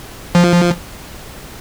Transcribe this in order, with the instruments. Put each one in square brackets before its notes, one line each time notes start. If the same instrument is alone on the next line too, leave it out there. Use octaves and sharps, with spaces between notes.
[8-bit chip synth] F3